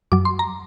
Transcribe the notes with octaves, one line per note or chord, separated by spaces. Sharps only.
F#2 F#3 D6
C6
A#5